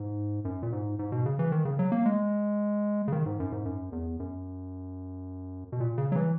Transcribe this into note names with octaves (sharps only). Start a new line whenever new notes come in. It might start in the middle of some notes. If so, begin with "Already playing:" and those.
Already playing: G#2
F#2
A#2
G#2
G#2
B2
C#3
E3
D#3
C#3
F#3
A#3
G#3
C#3
D#3
G#2
F#2
G#2
F#2
E2
F#2
B2
A#2
C#3
F#3
E3